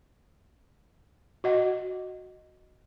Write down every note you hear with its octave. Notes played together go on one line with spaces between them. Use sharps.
F#4 D#5 F#5